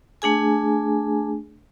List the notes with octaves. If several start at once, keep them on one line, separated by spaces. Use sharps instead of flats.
A3 D4 G#4 G#5